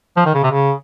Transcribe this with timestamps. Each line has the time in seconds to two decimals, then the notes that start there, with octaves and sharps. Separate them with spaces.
0.17 F3
0.25 D#3
0.34 C#3
0.43 C3
0.51 C#3